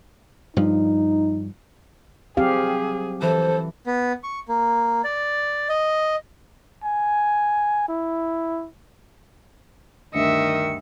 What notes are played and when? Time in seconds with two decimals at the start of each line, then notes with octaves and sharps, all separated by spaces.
0.57 G2 F3 D#4
2.37 F#3 G3 C4 G4 G#4 F5
3.22 E3 A4 C5
3.87 B3
4.23 C#6
4.48 A#3
5.04 D5
5.69 D#5
6.84 G#5
7.89 E4
10.14 D2 G2 D#3 D#5 E5 C#7